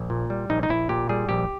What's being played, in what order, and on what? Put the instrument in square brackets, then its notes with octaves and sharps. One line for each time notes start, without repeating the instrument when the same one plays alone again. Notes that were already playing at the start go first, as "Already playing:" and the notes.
Already playing: [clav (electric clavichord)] A#1
A#2
G3
A#1 D#4
D#4
A#1 E4
A#2 G4
G3 G#4
A#1 G4